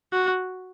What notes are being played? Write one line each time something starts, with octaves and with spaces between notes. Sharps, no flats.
F#4